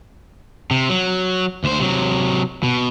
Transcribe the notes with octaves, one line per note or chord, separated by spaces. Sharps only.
C3
F#3
D2 C5
C3 F#3
B2